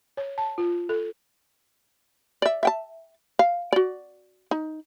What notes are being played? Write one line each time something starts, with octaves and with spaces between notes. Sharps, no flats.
C#5
A5
F4
A4
D5 E5
E5 G5 A5
F5
F#4 D5
D#4